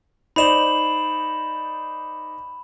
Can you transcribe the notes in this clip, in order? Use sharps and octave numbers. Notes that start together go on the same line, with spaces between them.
D#4 C5 D5 B5 E7 F#7